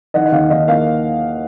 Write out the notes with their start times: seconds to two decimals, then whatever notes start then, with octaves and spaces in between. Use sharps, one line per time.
0.14 D#3 D#5 F#5
0.25 F#5
0.32 D#2 F5
0.50 D#2 D#5
0.68 A#3 F5